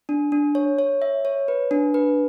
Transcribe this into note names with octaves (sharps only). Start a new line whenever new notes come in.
D4
D4
C#5
C#5
E5
C#5
B4
D4
B4